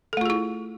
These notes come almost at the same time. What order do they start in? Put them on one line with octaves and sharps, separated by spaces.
A4 A3 F4 G#4 E4